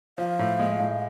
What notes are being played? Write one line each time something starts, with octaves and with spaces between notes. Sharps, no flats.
F3 F5
A2
G#3
A2